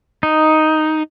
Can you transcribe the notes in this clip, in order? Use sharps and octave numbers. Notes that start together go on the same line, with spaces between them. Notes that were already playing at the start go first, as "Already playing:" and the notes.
D#4